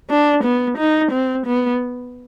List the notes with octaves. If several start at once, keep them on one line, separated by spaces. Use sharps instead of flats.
D4
B3
D#4
C4
B3